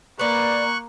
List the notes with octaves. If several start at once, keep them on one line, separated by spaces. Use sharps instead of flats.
A#3 B4 D5 C#6 F#6